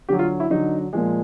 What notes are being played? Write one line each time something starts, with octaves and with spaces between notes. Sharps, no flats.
D3 F#3 G4
F4
E4
D3 F#3 D#4
A#2 F3 G#3